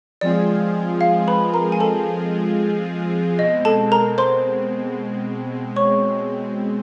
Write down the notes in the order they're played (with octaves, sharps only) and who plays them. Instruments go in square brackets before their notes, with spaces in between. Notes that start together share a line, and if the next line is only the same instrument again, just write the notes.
[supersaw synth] F3 G#3 C4 F4 G#4 [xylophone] D5
[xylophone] F5
B4 B5
A#4 A#5
G#5
A4 A5
[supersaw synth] B2 G#3 C4 [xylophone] D#5
[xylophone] A4 A5
A#4 A#5
C5 C6
C#5 C#6